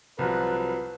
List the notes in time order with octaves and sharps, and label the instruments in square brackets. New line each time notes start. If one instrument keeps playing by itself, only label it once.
[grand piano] C2 F3 F#3 [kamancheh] B4